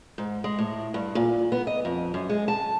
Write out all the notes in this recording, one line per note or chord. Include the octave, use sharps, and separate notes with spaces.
G#2
G#3
A2
G2
A#2
B3
D#5
F2
F#2
G#3
A5